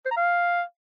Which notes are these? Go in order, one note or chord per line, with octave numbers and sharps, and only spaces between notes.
C5
A#5
F5